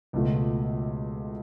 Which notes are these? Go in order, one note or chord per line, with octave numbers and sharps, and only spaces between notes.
C#2 B2 A3 F4